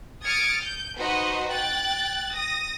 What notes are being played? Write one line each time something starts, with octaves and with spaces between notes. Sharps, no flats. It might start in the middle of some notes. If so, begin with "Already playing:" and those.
D#6 F6 G#6 A6 C#7 D7
G6
D#4 F#4 B4 C5 D#5
G5 F#6 A6
D#6 A#6